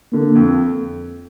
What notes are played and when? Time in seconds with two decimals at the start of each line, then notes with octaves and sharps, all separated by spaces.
0.12 D3 A#3
0.35 F2